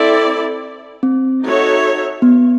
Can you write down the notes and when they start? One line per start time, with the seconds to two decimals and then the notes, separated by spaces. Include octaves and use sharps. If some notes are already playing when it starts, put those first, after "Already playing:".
Already playing: C4 E4 A4 D5
1.03 C4
1.42 D#4 F#4 A4 C#5 E5
2.22 B3